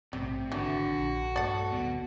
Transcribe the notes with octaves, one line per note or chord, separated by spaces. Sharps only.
A#1 G#2 C3 G3 A3
G#1 D3 E3 F#4
A#1
G2 A3 A4 D5 F#5
D1 B1 B2